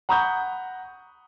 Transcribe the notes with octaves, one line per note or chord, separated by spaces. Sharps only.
F#5 A#5 B5 C#6 D#6 G6